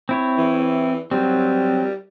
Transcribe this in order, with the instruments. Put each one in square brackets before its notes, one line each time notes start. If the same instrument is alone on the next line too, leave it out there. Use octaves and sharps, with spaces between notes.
[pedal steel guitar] C4 E4 C#5
[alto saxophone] E3
[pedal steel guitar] F#3 C4 [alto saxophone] G3